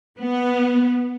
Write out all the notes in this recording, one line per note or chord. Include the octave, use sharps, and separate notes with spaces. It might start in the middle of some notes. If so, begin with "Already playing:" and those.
B3